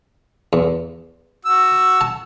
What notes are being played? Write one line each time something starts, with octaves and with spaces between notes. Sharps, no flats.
E2
F#4 E6
A5